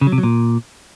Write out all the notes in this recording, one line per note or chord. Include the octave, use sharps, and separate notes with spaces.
C#3
F#3
C3
F#3
A#2